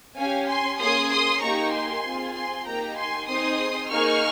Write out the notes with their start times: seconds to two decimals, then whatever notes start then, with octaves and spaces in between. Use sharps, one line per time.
0.17 C#4 G4 F5 G#5
0.48 G#5 C6
0.80 A#3 C#4 G#4 C6 D#6
1.11 C6 D#6
1.42 A#3 D#4 G4 A#5 C#6
1.73 G#5 C6
2.04 C4 F4 G#4
2.35 G#5 C6
2.66 A#3 D#4 G4 G5 A#5
2.97 G#5 C6
3.28 C4 D#4 G#4 C6 D#6
3.91 A#3 D#4 G#4 C#6 F6